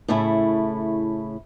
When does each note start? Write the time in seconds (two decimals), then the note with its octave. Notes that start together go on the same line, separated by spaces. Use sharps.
0.08 A2 C#3 A3 E4